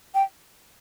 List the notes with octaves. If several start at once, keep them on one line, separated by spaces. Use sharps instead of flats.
G5